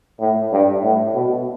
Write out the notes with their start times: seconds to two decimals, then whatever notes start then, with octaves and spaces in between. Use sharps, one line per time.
0.20 A2
0.52 G2
0.83 A2
1.15 B2